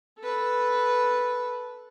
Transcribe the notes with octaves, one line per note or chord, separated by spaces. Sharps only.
A4 B4